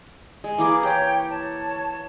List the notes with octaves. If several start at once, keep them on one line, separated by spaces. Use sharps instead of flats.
G#3
E3 A#3 G#4 D6
G4 C#5 G5
C#5 A5